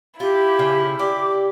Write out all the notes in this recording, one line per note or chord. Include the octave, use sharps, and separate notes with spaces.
E4 F4 G4
C#3 F4 G5
G4 D5 D6